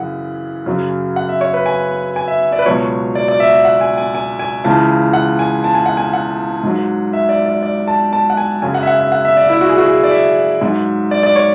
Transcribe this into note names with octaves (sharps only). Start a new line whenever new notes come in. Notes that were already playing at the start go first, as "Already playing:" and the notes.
Already playing: F#2 C#3 E3 F#5
F#2 C#3 F#3
F#5
E5
C#5
B4
G#5
G#5
E5
D5
B4
C#2 B2 F#3 C#5
D5
D5
E5
F#5
G#5
G#5
G#5
G#5
C#2 C#3 E3 A5
F#5
G#5
A5
G#5
F#5
G#5
F#5
G#2 F#3
E5
D5
D5
D5
A5
A5
F#5
G#5
F#2 C#3 F#3 G#5
F#5
E5
F#5
E5
F#5
E5
D5
E4
F#4
G#4
F#4
G#4
D5
E5
G#2 F#3
D5
D5
C#5